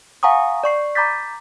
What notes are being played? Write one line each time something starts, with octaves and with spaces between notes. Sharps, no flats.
F5 F#5 G#5 A#5 C#6 D#6
D5 C#6 C7
A#5 B5 D6 G6 A6 B6